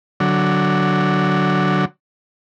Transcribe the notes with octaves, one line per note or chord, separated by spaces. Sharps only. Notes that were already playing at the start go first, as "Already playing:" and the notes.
D3 F#3